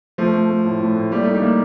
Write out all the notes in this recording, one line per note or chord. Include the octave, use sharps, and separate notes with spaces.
F3 A3
A3
A3
A2
A2
A2
G3 A#3
A3 D#4
G3
A#3